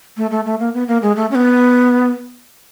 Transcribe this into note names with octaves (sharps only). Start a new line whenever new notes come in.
A3
A3
A3
A#3
B3
A#3
G#3
A3
C#4
B3